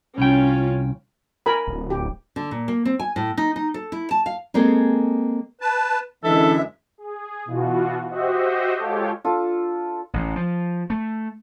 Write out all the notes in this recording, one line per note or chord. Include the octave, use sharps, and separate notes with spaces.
C2 C#4 F4 G5
A#4 G#5 B5
D1
G4
D3
A#2
A#3
C4
G#5
A2
D#4
D#4
A4
E4
A5
F5
G#3 A#3 C4 G#4 A4
B4 A5
F#2 D3 E3 G#3 A4 E5
G#4
B2 E3 F4 F#4
F#4 G4 C5 D#5 E5
G#3 F4 G4 A4 C#5
D4 F4 A4
A1
F3
A3